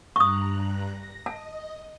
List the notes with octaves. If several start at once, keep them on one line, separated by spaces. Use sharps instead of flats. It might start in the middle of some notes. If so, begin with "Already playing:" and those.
G2 A#5 C#6 D#6 F#6
A#6
D#5 A5